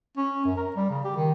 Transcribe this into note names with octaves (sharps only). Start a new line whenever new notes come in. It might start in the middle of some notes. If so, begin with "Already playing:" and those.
C#4
F#2
A#4
G3
C#3
G4
D#3